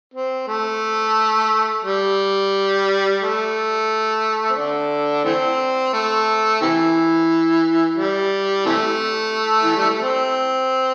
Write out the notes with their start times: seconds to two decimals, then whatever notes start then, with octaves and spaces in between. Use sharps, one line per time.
0.14 C4
0.48 A3
1.85 G3
3.21 A3
4.50 C4
4.56 D3 D4
5.25 E3 A3 C4
5.93 A3
6.62 C3 E3
7.98 G3
8.66 C3 E3 A3
9.63 E3
9.76 G3
9.89 A3
10.02 C4